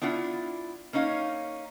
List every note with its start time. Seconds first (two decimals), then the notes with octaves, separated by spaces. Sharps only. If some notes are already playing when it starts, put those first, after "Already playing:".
0.02 B3 D4 E4 F4 F#5
0.93 A#3 C#4 D#4 C#5 F5